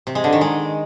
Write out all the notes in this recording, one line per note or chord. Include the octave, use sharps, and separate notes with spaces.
C3
G#3
D3
D#3
G#3